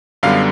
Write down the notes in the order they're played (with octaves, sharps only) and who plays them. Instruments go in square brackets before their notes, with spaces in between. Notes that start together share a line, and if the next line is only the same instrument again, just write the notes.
[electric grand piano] F#2 D3 G3 B3 F5